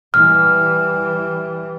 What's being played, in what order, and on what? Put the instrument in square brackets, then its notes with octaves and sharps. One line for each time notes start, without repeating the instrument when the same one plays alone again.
[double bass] E3 G3 [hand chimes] F6